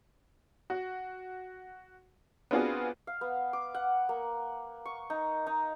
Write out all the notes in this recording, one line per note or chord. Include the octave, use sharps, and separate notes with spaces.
F#4
B3 C4 D4 F4 F#4 G#4
F5
B3
D6
F#5
A#3
C#6
D#4
D#4